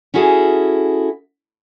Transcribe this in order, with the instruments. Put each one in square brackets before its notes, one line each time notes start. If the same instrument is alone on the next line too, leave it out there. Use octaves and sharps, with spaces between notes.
[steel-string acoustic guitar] C#4 E4 F#4 G#4 A4